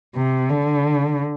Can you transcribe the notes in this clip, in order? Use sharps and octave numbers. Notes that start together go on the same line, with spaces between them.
C3
D3